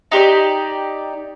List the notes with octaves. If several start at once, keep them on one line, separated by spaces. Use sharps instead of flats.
D#4 G4 C#5 D5